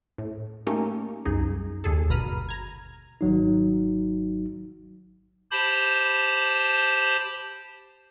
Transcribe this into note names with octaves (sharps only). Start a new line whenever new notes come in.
A2
A3 A#3 C#4 D#4 G4 A#4
C2 F#2 D#4 G#4
D#2 G#4 A4
G1 B2 A#5 B5 F6 D#7
A#5 G#6
G#1 F#3 D#4
G4 C5 A5 B5